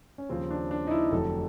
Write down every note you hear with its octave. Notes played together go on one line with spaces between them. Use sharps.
C#4
D#2 C#3 F3 C4
D4
D4
D#4
E4
F1 F2 D3 F#3 A4